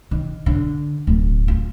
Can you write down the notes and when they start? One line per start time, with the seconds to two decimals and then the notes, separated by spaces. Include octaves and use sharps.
0.11 D#3
0.46 D3
1.07 D1
1.48 F4